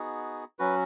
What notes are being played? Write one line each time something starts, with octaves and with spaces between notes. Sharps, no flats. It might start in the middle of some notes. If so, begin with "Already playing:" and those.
Already playing: B3 D#4 F#4 G#4
F#3 C#4 F#4 B4